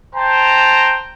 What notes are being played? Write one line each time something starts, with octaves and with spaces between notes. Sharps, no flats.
C5 G5 A5 A#5